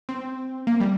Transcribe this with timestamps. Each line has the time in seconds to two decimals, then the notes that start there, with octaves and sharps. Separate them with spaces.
0.09 C4
0.67 A#3
0.80 G3